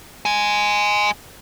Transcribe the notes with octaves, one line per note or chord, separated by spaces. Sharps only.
D#5 G#5